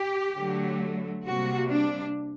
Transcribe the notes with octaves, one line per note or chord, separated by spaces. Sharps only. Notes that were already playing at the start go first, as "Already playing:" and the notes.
Already playing: G4
D3 F#3 A3
C3 G3 A#3 F#4
D4